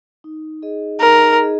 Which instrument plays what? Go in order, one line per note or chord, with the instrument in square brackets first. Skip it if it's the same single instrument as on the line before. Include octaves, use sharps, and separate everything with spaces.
[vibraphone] D#4
G#4 D#5
[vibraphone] D#4 [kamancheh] A#4
[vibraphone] G#4 D#5